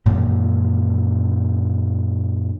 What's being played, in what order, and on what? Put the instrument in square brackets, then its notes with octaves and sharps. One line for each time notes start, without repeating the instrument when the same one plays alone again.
[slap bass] F#2 A#2 D#3 E3